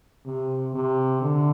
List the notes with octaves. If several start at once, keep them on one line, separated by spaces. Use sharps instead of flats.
C3
C3
D3